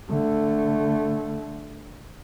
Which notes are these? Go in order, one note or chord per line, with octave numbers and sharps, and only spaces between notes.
D3 A3